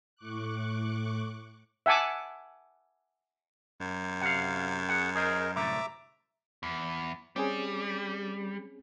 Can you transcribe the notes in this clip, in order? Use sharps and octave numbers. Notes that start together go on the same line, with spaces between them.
A2 C#6 D6 F#6
E5 F#5 G#5 A5 D6
F#2
C3 F5 F#5
G#4 F#5
G#4 A#4 C5 D#5
C2 A2 D3 E5 A#5 D6
E2
G3 C4 C#4 G#4